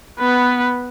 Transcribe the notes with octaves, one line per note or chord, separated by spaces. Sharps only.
B3 B4